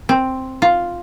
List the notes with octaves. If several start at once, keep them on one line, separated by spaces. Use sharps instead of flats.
C4
F4